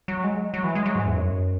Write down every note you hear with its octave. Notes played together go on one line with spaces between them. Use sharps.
F#3
G#3
F#3
E3
G#3
F#3
G#2
E2
F#2